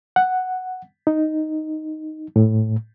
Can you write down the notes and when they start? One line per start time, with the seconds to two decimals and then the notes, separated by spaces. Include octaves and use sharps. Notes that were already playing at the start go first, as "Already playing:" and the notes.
0.16 F#5
1.07 D#4
2.36 A2